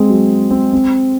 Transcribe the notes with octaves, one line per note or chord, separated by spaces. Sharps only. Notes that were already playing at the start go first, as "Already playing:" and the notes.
Already playing: G#3 C4 G#4
F#3
C4
C4